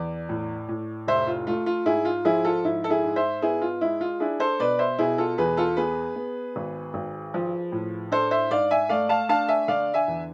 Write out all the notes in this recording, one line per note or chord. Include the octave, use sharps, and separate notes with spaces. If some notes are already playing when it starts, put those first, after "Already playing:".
Already playing: E2 D5
A2
A2
F1 C5 E5
F4
A3 F4
F4
G#2 E4 G#4
F4
F3 E4 G#4
F4 A4
G#2 E4
A4
E4 G#4
G#2
C5 E5
B3 E4 G#4
F4
G#3 E4
F4
D4 E4 G#4
A4 C5
B2 B4 D5
C5 E5
B2 E4 G#4
F4 A4
E2 G#4 B4
F4 A4
B3 G#4 B4
B3
G#1
G#1
F3
A2
D4 A4 C5
C5 E5
G#2 D5 F5
E5 G#5
A3 D5 F5
F5 A5
D4 F5 A5
E5 G#5
D3 D5 F5
E5 G#5
E2